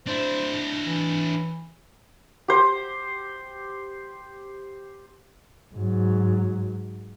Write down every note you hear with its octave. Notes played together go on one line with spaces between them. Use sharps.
D4 E4 C5
E3
G4 C5
G#2 F#3